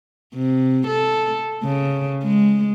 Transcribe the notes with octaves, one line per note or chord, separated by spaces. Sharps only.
C3
A4
C#3
G#3